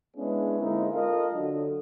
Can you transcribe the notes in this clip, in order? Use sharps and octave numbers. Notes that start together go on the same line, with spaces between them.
G#3 B3 C#4 D4 E4 G#4
D3 G#3 A#3 C4 D#4 E4
F4 A4 A#4 D#5 F5
D3 F#3